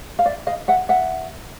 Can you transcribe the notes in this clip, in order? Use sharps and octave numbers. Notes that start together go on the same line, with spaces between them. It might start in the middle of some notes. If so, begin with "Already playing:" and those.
F5
D5 E5
D#5 F5
E5 F#5
E5 F#5